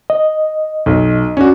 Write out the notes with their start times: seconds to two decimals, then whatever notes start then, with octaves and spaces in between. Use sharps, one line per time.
0.10 D#5
0.86 B1
1.37 C#4 D4 F#4